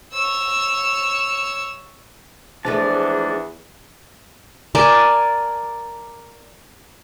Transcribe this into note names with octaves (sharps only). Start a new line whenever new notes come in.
C#5 E6
E2 F3 G#3 A3 D4 A5
A#4 D5 G#5 A5